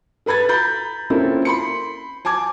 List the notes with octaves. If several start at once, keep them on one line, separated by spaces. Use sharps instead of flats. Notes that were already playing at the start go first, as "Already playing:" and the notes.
A4 B4 B5 G#6 A6
A#5 B5 G6 A6
A#3 C4 C#4 E4 F4 A4
B5 C6 C#7
G#5 A5 D6 G#6